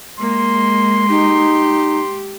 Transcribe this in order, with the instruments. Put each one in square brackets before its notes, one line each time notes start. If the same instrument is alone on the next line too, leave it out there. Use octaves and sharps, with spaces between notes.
[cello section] G#3 [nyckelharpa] A#3 [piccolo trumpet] C6
[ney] D#4 [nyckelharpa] G4